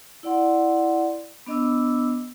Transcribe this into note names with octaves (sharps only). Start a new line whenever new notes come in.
E4 D5 F#5 C6
B3 D4 D#5 D6 E6